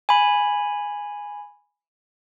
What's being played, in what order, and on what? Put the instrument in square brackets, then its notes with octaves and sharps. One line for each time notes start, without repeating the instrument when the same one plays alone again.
[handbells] G#5 B5